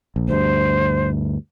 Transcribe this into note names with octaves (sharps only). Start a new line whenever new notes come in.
A#1
D2 G2 C5